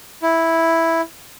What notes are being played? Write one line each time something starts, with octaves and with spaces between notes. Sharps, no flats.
E4